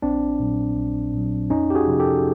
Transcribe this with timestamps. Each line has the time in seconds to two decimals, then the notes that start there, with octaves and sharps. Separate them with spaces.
0.02 A#1 C4 D4
0.40 A#2 F#3
0.76 A#1
1.13 A#2 F#3
1.50 F2 C#4 D#4
1.70 G4
1.75 F#4 G#4
1.87 C3 F3
2.00 G4 A4